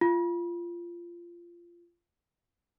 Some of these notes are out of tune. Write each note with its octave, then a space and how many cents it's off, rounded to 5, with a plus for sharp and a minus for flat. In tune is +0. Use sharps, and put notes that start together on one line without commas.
F4 -20